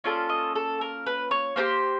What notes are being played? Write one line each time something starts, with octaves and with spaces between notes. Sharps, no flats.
A#3 C#4 F4 A4 D5
D#5
A4
A#4
B4
C#5
A#3 D#4 G4 C5